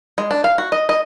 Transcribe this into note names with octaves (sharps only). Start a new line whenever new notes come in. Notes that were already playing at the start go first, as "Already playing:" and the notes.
G#3
D4
F5
F#4
D#5
D#5